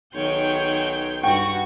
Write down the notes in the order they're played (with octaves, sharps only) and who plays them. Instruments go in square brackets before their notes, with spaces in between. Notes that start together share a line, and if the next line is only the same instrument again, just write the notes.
[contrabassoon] B1 [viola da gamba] D#3 F#4 C#5 [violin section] G#4 G5 G6
[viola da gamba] G2 [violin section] F#4 C#6 [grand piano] G5